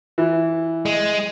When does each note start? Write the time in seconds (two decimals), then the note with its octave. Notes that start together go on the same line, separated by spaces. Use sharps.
0.18 E3
0.86 G#3